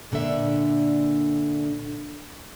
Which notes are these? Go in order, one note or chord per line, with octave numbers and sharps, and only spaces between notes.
A#2 D3 D4 E5